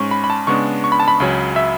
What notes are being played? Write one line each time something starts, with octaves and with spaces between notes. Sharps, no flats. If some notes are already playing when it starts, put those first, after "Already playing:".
Already playing: G#2 G#3 C#4 C#6
B5
B5
A5
C#3 G#3 B3 D4 C#6
C#6
B5
A5
B5
C#2 C#3 F#3 C#4
E5